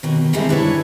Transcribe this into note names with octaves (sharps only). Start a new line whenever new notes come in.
D#2 B2 D#3
D3 G3 G#3 C4 D#4 E4
D4 E4 B4 C#5